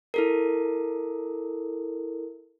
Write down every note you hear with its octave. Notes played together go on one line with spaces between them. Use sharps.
E4 A4 A#4